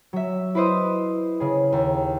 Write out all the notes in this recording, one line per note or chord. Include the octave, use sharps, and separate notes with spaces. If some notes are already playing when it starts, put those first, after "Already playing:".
F#3 E5
E4 B4 C5 D#5
C#3 G#4
D#2